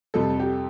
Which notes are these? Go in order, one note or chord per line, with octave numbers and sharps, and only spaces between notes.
F2 C3 G3 A4
G4